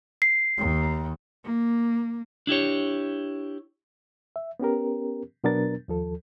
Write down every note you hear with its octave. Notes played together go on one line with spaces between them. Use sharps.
C7
D#2
A#3
D4 E4 G4 C#5
E5
B3 C#4 G4 A#4
B2 F#3 B3 D4 A#4 A6
D#2 F3 A4